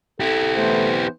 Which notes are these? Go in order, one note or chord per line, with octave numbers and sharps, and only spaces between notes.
E4 G4 A4
E3 A3 B3 C5